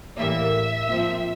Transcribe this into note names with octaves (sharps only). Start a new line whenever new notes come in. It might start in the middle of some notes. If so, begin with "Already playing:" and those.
A2 E3 G3 A#3 E5
A#2 F3 C4